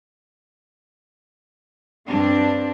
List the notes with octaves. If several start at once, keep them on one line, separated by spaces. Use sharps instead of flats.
G2 C4 D4